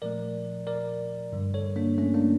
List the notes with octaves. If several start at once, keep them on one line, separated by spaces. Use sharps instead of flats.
A#2 F3 A3 A#4 D5
A#4 D5
G2 D3 G3
A4 C#5
A#3 D4
A3 C#4
A#3 D4